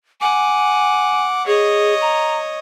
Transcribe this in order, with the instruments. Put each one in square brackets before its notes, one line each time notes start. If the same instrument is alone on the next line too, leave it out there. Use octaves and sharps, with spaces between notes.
[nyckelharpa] F#5 D6 [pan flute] G#5
[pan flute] G#4 [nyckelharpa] C#5 D#5
[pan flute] A#5